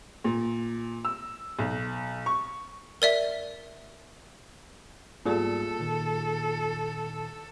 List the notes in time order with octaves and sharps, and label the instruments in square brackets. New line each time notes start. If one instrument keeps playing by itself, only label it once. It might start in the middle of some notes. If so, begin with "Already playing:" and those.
[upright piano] A#2
E6
B1
C#6
[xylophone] A#4 D5 E5
[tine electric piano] G#2 G3 B3 [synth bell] A#3 F4 G#4 [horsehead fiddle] A4
[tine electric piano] A#2 D#3